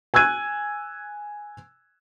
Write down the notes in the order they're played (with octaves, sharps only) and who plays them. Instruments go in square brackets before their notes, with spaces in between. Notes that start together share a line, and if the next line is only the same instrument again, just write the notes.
[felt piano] G#5 E6 F#6 G#6 D#7